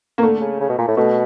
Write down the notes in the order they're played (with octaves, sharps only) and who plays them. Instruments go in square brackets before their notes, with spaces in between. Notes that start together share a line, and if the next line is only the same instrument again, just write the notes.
[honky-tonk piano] A#3
[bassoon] D3 [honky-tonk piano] A3
[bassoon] C#3
C#3
B2
A#2
A2
[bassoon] B2 [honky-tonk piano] A3